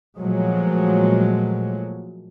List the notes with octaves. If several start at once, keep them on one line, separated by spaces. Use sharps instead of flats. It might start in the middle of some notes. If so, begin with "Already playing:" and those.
A#2 F3 F#3 G#3 A3